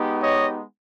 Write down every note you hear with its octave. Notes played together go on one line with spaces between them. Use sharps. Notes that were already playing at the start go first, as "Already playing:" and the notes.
Already playing: G#3 B3 D#4 G4
C#5 D#5